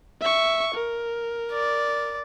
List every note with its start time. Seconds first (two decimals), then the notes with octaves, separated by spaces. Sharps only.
0.21 E5 C#6
0.75 A#4
1.51 D5